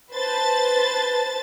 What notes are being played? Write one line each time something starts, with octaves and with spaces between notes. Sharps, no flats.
B4 C5 A5 A6